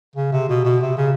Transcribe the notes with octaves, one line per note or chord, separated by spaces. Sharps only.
C#3
C3
B2
B2
C3
C#3